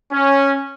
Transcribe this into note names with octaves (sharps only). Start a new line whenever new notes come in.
C#4